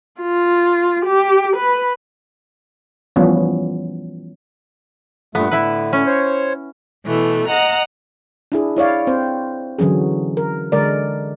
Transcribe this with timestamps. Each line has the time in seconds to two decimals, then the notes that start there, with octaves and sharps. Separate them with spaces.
0.21 F4
1.05 G4
1.56 B4
3.16 E3 F3 G3 B3 C#4
5.35 G2 A#2 A3 B3
5.51 A2 D3 E4 B4
5.93 C#4
6.06 C5 C#5
7.06 B2 E3 A3
7.47 D#5 F#5 A#5
8.52 D4 E4 G#4
8.77 E4 C#5 D5 F5
9.07 C4 C5
9.79 D3 E3 F#3 C#4 G#4
10.37 A#4
10.72 D3 G#3 A#4 D5